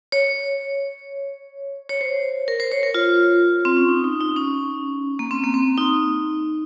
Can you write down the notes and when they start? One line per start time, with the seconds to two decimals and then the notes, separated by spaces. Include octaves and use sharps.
0.12 C#5
1.89 C#5
2.01 C5
2.48 A#4
2.60 C5
2.72 C#5
2.83 A#4
2.94 F4
3.65 C4
3.77 C#4
3.89 D#4
4.04 D#4
4.21 D#4
4.36 C#4
5.19 A#3
5.31 C4
5.44 A#3
5.54 C4
5.77 D#4